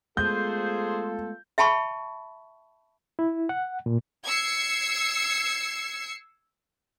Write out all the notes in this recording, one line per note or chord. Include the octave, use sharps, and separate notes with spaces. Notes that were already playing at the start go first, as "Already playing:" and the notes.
G#3 A3 B3 F4 G#4 A4 C5 G6
E5 G5 A5 B5 C#6
E4
F#5
A#2
E6 G#6 C7 C#7